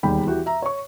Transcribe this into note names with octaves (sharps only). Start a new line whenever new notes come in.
E1 D#2 D#3 G3 G5 B5
E3 F#4 G4
E5 A#5
C#5 C#6